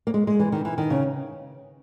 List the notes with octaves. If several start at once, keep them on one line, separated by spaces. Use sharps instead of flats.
A#3
G#3
G#3
E3
D#3
E3
D#3
C#3